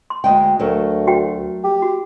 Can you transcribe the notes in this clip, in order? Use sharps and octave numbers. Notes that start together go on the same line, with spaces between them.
C6
D2 G#3 G5
D2 F#3 A3 A#4
F#4 G5
G4
F#4